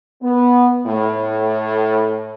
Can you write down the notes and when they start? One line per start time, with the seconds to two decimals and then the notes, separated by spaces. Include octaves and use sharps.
0.23 B3
0.87 A2